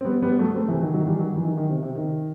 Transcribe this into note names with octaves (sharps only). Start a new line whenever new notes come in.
C4
G3 B3
G3 B3
F#3 A3
A3 C4
C3 E3
D#3 F#3
D#3 F#3
E3 G3
D#3 F#3
E3
D#3
D#3
C3
C3
D#3